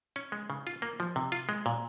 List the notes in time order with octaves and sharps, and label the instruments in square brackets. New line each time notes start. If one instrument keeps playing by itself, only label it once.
[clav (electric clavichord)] C#4
G#3
C#3
F4
A#3
F3
C3
F4
G#3
A#2